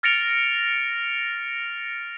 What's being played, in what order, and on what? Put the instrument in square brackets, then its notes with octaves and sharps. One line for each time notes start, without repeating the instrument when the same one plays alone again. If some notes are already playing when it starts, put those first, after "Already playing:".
[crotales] F6 A6 A#6 C#7 D7 F7